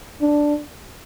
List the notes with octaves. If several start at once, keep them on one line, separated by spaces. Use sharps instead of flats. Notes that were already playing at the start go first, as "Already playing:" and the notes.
D4